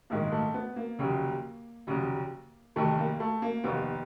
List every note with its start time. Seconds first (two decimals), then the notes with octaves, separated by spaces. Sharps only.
0.10 A#1 G#2 D#3 G#3 A#3
0.32 A3
0.54 B3
0.76 A#3
0.99 F1 D#2 C#3 F#3
1.87 F1 D#2 C#3 F#3
2.76 F1 D#2 D#3 A3
2.98 A#3
3.20 A3
3.42 A#3
3.64 F1 D#2 D#3 B3